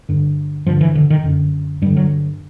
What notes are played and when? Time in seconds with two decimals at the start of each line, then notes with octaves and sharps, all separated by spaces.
0.09 G2 D3
0.67 G2 D3 F3
0.81 E3
0.95 D3
1.10 D#3
1.24 F#2 D3
1.82 G2 G3
1.87 D3
1.97 F#3